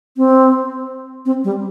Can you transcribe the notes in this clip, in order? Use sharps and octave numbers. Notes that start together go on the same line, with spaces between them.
C4
C4
G3